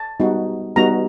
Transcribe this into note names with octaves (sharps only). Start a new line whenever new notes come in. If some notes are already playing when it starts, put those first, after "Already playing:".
Already playing: A5
G3 B3 D#4 F#4
G3 B3 D#4 F#4 A#5